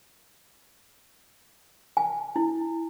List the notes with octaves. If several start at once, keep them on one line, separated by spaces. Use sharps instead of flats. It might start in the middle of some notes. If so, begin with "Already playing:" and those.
G#5
E4